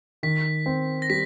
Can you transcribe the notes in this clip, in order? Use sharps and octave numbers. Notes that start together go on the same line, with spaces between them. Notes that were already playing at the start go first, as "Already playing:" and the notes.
D#3 B6
C4
A#6
G3 B6